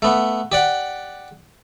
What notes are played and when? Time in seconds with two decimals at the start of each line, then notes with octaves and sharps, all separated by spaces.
0.02 A3 B3
0.52 G4 D5 F#5